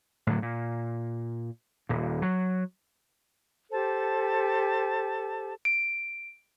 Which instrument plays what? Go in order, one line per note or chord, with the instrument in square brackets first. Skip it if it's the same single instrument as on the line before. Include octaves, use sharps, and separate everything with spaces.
[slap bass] A2 D3 F#3
A#2
D#1 A#2
F#3
[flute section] G4 A4 C5 A5
[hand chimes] D7